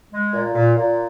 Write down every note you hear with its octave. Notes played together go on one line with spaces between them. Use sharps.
G#3
A#2
A#2
A#2